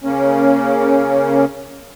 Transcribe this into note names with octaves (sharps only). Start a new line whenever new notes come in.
C#3 A#3 C#4